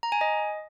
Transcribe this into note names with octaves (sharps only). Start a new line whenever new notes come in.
A#5
G#5
D#5